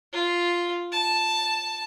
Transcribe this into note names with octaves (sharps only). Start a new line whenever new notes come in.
F4
A5